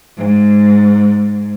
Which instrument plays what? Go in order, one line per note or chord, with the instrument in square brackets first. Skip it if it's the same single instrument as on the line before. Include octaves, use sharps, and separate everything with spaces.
[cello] G#2